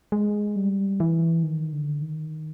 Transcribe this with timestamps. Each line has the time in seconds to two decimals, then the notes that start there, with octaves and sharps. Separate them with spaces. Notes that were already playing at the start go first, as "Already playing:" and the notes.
0.12 G#3
0.56 G3
1.00 E3
1.43 D#3
1.73 D3
2.02 D#3